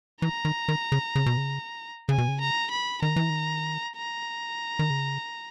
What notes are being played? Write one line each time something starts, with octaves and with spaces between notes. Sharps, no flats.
E3 A#5
D#3
D#3
C#3
C#3
B2
C#3
C#3 G#5
B2
C#3
A#5
B5
D#3 A#5
E3
D#3
A#5
D#3
C#3